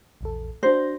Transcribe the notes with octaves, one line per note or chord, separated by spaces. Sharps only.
A#1 E2 A4
D4 F#4 C5 A#6